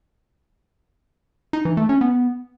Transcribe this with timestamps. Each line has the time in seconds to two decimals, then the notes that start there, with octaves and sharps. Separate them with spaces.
1.53 D#4
1.65 E3
1.77 A3
1.89 C#4
2.01 B3